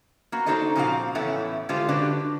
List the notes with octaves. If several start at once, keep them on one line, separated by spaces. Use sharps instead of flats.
A#3 B3 F#4
D4 D#4 F#4 A4 C5 D#5
A#2 C#3 F3 C4 F#4 F5
A2 E3 A3 B3 C#4 E4
D3 G#3 F4 G4 A4 C5
D3 D4 F#4 G4 B4 D5